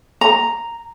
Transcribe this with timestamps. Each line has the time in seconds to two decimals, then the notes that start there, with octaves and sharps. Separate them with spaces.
0.21 A#5